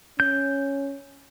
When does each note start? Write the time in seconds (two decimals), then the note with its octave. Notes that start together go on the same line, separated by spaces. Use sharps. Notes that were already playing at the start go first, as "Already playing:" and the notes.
0.20 C#4 G6